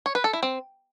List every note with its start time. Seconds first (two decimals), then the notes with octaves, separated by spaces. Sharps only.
0.06 C#5
0.15 B4
0.24 A4
0.33 E4
0.43 C4